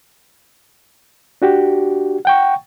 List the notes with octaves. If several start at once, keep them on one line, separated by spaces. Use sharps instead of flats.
D4 F#4 G4
F#5 G5 C#6